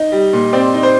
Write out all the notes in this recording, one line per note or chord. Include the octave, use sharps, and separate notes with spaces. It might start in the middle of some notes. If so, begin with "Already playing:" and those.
Already playing: D#4 D#5
G3
A#2
C4 D5
D#4
C5